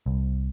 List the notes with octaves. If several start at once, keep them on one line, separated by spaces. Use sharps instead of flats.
C2